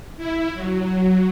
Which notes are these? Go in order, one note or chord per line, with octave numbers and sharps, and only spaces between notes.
E4
F#3